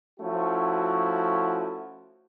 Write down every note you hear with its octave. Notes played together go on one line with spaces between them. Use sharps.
F3 A3 C#4 E4 F#4